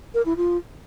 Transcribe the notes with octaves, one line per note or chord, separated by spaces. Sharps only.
A#4
E4
F4